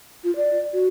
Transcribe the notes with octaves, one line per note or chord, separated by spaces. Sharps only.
F4
D5
F#4